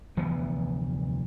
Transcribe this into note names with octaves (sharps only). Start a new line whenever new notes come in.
F1 D2 E3 B3